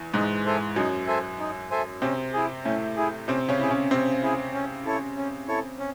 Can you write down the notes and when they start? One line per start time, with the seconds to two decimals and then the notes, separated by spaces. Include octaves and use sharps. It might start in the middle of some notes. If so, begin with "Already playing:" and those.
Already playing: E2 E3
0.13 G#2 G#3 D#4
0.45 A4 C5 E5 G#5
0.76 F#2 F#3 D#4
1.07 A4 C5 E5 G#5
1.39 D#4
1.71 A4 C5 E5 G#5
2.02 C3 C4 C#4
2.33 E4 G#4
2.65 A2 A3 C#4
2.97 E4 G#4
3.28 C3 C4 C#4
3.49 C#3 C#4
3.60 E4 G#4
3.70 C#3 C#4
3.91 C3 C4 C#4
4.23 E4 G#4
4.54 C#4
4.86 E4 A4 C#5
5.17 C#4
5.48 E4 A4 C#5
5.79 C#4